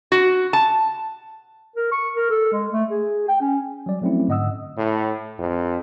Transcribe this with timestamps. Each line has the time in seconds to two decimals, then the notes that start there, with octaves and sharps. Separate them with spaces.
0.12 F#4
0.53 A5
1.76 A#4
1.92 C#6
2.16 A#4
2.30 A4
2.52 G#3
2.73 A3
2.91 G#4
3.28 G5
3.41 C#4
3.86 F#3 G3 D5
4.01 F3 F#3 A3 C4 C#4 E4
4.28 G#2 D3 D#5 F#5 D#6 E6
4.77 A2
5.38 F2